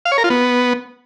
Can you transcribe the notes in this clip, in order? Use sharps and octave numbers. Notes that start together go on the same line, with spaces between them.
F5
C#5
A#4
F4
B3